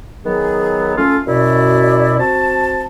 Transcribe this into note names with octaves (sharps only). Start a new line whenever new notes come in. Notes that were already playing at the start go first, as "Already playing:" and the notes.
D#3 F#3 B3 G#4
A3 C#4 F4 A4
F#2 B2 E4 D5
C4 F#4 A5